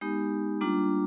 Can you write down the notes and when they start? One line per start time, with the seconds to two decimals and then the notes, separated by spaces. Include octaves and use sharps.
0.01 G#3 B3 D#4 G4
0.61 G3 A#3 D4 F4